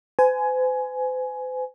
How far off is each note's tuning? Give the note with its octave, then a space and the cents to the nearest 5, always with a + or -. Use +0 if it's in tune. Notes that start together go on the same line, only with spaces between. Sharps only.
C5 -45 G#5 +15